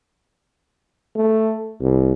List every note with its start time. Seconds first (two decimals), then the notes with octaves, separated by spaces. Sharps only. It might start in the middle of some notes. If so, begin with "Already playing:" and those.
1.16 A3
1.81 C2